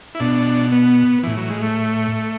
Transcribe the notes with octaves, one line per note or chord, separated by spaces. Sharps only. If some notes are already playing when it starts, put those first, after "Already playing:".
E4
B2 D4
B3
A2 E3
F#3
G#3
A3